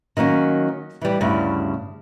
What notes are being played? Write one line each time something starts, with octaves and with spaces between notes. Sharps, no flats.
D#3 F#3 A#3 C#4
E3 G3
D2 G2 C#3 E4